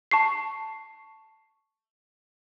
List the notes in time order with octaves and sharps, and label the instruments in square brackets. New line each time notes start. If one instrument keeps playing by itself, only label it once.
[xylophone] A5 C#6 C7